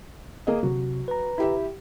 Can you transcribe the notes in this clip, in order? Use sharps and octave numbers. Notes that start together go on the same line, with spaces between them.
A#3 G#4 D#5
C3 F#3
B4 A#5
E4 G4 E5